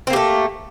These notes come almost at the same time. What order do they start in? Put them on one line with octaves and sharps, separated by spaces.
C4 A#3 G4 A3